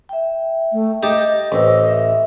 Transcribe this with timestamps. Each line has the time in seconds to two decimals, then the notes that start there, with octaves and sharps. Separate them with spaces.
0.09 E5 G5
0.72 A3
1.03 D#4 G4 D#5 A5
1.52 A1 B4 C5 D#5 E6
1.89 E5